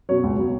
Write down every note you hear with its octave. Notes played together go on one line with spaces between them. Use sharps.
B2 F#3 C#5
C#2
B2 F#3